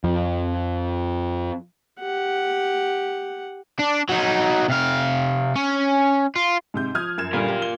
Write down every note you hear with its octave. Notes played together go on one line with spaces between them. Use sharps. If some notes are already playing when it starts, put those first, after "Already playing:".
F2 F3
G4 F#5
D4
F#3 D#4
C3 F5
C#4
F4
G#2 C3 G6
F3 D#6 F6 G#6
F#2 G#6 E7
A#2 D3 G3 F4 A#4 F5
G4
G7